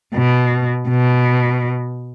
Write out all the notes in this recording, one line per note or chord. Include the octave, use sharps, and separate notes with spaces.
B2
B2